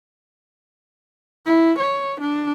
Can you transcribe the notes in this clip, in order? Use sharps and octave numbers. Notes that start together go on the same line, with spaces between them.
E4
C#5
D4